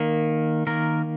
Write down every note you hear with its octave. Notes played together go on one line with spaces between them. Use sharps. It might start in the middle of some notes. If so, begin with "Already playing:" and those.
Already playing: D#3 A#3
D#3 A#3 A#4